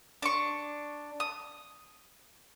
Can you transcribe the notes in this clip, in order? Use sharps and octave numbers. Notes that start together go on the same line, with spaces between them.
D4 C#6
D#6